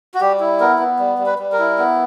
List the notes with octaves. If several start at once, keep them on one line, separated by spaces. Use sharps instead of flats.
F#4
G3 G4
E4
B3 A#4
B3
G3
G3
B4
G3
A#4
E4
B3